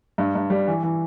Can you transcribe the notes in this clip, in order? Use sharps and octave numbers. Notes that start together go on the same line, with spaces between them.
G2
G2
G3
E3
E3